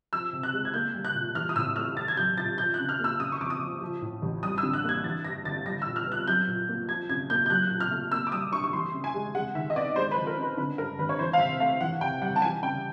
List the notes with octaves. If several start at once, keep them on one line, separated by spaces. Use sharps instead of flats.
F3 E6
C3
F#6
G#3
G#6
A#3 G6
G3
F#6
A#2
E3 F6
D#6
A2 E6
A3 F6
A3 A6
G#6
F#3 G6
A#2 A6
F3 G6
F#6
C#3
F6
A#3 E6
C#3 D#6
C#6
F2 D6
D#6
F3
F3
A2
A1
G3 D#6
E6
D3
F#6
A#3 G#6
E3 A6
G2 A#6
G1 A6
G3 A#6
E6
A#2
F6
B3 F#6
F#3 G6
A#2
A#3
F3 G#6
C#3 G#6
A#3 G6
G6
F#3 F#6
A#2
F6
A3
A#3 E6
D6
G3 D#6
D4 C#6
C#6
E3 C6
C#3
G#5
G#3
G#3 F#5
D#3 E5
D#5
B3 D5
G#3 C5
B4
F3
A#4
C#4
B4
D3 B4
G2 A#4
G#1 B4
C#5
E3 C5
F5
C3 E5
A3 F5
E3 F#5
C3 G5
G3 F#5
A5
E3 G#5
C#3 G5